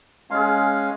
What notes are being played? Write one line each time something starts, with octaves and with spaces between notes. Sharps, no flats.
G#3 C#4 G#4 F5 C6